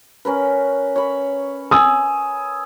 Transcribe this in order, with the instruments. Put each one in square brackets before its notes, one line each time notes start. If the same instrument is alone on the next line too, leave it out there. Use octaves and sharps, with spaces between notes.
[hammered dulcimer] C#4 A#4 B4
C#5 B5
[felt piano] G#5 D#6 E6